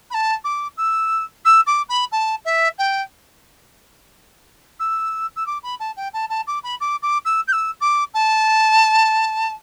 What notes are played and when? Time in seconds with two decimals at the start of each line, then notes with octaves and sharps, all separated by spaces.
0.10 B5
0.14 A5
0.44 D6
0.77 E6
1.45 E6
1.67 D6
1.89 B5
2.12 A5
2.45 E5
2.78 G5
4.79 E6
5.36 E6
5.46 D6
5.63 B5
5.80 A5
5.97 G5
6.13 A5
6.30 A5
6.47 D6
6.63 B5
6.80 D6
7.02 D6
7.25 E6
7.48 G6
7.53 E6
7.81 D6
8.14 A5